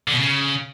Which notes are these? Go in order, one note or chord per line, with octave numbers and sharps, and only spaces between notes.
D3
B2
C#3